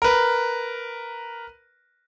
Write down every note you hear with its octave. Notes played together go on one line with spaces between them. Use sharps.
A#4 B4